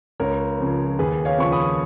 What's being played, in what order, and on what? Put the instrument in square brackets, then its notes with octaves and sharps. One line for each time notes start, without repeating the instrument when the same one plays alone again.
[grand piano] C#2 A#4 C#5
C#3 F3
D#2 G#4 B4
C#5 F5
C#3 F3 C#6
B5 D#6